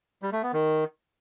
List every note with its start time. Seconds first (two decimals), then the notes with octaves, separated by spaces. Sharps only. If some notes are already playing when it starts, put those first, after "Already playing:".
0.22 G3
0.33 A3
0.43 B3
0.53 D#3